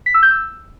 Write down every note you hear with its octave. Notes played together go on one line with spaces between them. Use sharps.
B6
E6
G6
E6